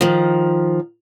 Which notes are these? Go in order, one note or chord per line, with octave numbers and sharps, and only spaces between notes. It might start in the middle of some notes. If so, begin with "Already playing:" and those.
D#3 F3